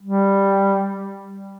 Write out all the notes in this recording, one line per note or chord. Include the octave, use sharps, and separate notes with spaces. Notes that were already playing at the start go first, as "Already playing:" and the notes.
G3